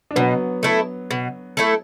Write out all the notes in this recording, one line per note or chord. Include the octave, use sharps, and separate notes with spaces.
D4
B2 F#3 B3
A3 E4 A4
B2
A3 E4 A4